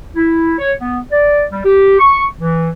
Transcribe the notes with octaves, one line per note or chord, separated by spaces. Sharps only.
E4
C#5
B3
D5
G3
G4
C#6
E3